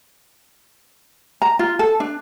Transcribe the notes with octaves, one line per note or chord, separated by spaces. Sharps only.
A#5
F4
A4
D4